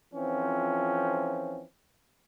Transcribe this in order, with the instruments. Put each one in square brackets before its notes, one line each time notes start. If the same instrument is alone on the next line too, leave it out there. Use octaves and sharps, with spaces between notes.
[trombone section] F2 E3 F3 C4 C#4